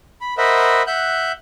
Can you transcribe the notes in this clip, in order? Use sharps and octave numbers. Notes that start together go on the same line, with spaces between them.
B5
A#4 C5 D#5 E5 F#5 B5
E5 F#5 F#6 G6